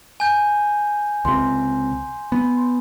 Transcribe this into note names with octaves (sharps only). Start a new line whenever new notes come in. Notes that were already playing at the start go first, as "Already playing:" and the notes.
G#5 G6
C#2 C3 C6
B3